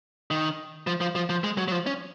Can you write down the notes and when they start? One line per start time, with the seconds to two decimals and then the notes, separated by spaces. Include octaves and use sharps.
0.31 D#3
0.87 F3
1.01 F3
1.15 F3
1.29 F3
1.44 G#3
1.58 F#3
1.68 F#3
1.72 F3
1.87 C#4